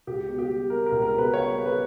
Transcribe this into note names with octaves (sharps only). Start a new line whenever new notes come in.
C#2 G4
B2
G4
G3
A#3 A#4
A#4
C#2
A#4
B2
B4
G3 C#5
A#3
B4